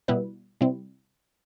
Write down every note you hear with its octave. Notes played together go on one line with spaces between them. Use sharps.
B2 G3 B3 E4 B4
C3 G3 C4 E4